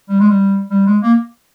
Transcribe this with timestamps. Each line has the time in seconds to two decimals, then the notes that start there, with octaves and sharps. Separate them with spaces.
0.09 G3
0.20 G#3
0.30 G3
0.71 G3
0.86 G#3
1.02 A#3